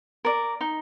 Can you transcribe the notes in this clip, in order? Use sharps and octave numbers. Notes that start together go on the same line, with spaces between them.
A#4 D5
D#4